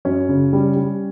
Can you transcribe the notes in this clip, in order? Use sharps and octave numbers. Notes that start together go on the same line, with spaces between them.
F#2 C#4
C#3
G3
G3